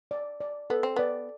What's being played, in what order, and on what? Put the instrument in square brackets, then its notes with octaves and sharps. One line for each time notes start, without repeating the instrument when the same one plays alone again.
[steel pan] D5
D5
[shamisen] B3 [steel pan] A4
[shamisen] C4
[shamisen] B3 [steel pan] D5